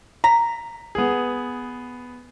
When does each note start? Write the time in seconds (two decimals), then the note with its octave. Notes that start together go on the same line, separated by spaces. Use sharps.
0.24 A#5 B6
0.95 B3 G#4